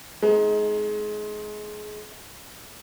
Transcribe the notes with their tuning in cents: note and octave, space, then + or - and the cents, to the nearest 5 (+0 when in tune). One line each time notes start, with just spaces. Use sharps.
G#3 +25 C4 +0 D#4 +0